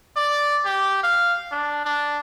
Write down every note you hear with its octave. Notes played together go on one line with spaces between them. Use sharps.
D5
G4
F5
D4
D4